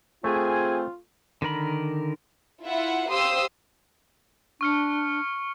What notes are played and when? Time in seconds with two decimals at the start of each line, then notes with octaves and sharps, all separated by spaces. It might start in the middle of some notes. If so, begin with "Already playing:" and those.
0.24 A3 C4 F4 G#4 G#5
1.42 D3 D#3 A#4 B5
2.63 E4 F4 E5 F#5
3.10 G4 C5 F5 C6 D#6 E6
4.61 D4 C#6 F6 C#7